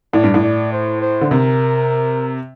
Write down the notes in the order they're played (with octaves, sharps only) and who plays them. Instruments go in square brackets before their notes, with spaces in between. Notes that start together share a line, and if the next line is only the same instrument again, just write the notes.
[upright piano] A2 [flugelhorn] D5
[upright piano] G2
A2
[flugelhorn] D5
C5
C5
[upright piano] D3
[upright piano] C3 [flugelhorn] A#4